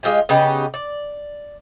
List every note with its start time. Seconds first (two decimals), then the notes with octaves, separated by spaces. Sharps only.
0.03 G#3 F4 G4 G#5
0.29 C#3 B3 D#4 G4
0.74 D5